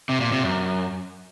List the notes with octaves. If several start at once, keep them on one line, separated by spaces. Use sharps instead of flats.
C3
A#2
C3
F#2